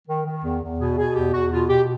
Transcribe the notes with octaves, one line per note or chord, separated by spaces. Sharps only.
D#3
D#3
E2
E2
B2 G#4
B2 G#4
E2 G4
E2 F#4
B2 F4
B2 G4